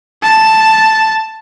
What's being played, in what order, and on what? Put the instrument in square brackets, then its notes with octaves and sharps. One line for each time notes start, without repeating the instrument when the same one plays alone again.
[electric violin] A5